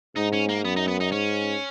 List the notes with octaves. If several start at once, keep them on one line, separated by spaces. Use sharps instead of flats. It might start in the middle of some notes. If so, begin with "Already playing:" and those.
G#2 D#4
C#4
A#3
F#2 B3
D#4
B3
D#4
G#2 C#4